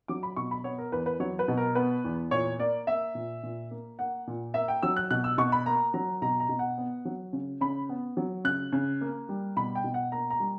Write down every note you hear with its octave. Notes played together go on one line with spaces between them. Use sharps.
F#3 D6
B5
B2 C#6
B5
B3 C#5
A#4
E2 B4
B4
F#3 C#5
B4
B2
A#4
B3 B4
E2
A#2 C#5
A#3 D5
A#3 E5
A#2
A#2
A#3
A#3 F#5
A#2
A#3 E5
G5
F#3 E6
F#6
B2 F#6
E6
B2 C#6
B5
A#3 A#5
F#3 A#5
B2 A#5
A#5
B2
F#5
B3
F#3
C#3
C#3 B5
B3
F#3
C#3 F#6
C#3
A#3
G3
B2 B5
G5
B2
F#5
A#3 A#5
A#5
G3